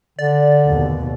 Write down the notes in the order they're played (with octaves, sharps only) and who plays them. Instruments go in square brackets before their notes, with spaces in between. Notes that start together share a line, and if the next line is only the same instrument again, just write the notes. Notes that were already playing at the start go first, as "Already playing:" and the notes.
[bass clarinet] D3 [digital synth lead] D5
[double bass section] D#2 B2